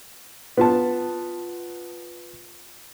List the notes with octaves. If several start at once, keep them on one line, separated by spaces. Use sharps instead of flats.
B3 F4 A5